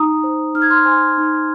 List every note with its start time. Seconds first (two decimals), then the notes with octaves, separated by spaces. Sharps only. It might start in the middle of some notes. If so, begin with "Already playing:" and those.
Already playing: D#4 A#5 D#6
0.23 C5
0.55 D#4 F6
0.62 G#6
0.70 C6 F6
0.85 C5 G#5 C6
1.18 D#4